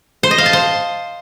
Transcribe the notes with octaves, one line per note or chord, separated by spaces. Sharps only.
C5
D#5
F5
A5
C5